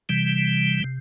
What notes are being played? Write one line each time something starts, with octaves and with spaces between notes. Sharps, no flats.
C3 E3 G3
C3